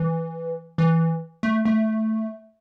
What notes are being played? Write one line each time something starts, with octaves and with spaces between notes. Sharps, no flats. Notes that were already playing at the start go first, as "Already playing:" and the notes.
Already playing: E3
E3
A3
A3